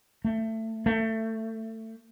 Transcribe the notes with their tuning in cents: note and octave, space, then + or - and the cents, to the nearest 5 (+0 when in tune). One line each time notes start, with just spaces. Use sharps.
A3 +20
A3 +20